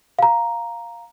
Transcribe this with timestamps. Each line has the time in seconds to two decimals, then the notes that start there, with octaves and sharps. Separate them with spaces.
0.19 F5 A#5